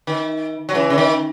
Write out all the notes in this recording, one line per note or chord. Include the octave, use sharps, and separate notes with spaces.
D#3
F#3
C#3 E3
C#3
D#3